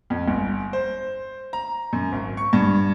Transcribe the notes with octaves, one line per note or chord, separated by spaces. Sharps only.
F2
G1
C5
A#5
F#2
G#1
C#6
G2